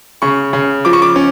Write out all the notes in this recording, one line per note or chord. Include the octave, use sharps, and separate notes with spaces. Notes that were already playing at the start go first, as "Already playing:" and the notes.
C#3 C#6
C#3
F3 D6
C#6
D6
C#4